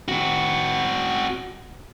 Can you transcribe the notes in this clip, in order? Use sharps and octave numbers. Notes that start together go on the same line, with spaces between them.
C4 F#4